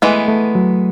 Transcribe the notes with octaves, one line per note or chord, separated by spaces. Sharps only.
E3 G#3 A3 B3
A3
F#3